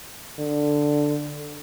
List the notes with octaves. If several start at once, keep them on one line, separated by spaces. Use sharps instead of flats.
D3